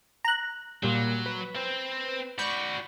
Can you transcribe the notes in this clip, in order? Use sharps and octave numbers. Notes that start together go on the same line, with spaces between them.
A#5 F#6
A#2 F#3 G3
B4
C4 C5
F#4 D5 B5 C#6 G6